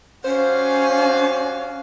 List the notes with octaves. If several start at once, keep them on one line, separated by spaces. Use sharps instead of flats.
G3 C#4 F#4 C5 F5